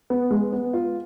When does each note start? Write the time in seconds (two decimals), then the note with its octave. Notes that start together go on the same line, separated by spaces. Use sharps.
0.10 B3
0.31 G#3
0.52 B3
0.73 F4